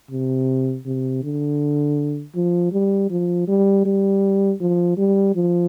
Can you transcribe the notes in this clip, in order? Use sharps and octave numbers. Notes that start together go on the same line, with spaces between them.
C3
C3
D3
F3
G3
F3
G3
G3
F3
G3
F3